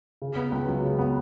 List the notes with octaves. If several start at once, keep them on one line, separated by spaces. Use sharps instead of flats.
C#3
B3
C#2
F#3
C#3
B3